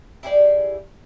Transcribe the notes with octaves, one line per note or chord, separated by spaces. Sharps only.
E4 G4 G#4 D5